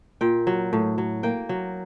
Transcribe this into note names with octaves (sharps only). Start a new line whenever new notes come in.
A#2 G5
F#3
A2
F#3
A#3 G5
F#3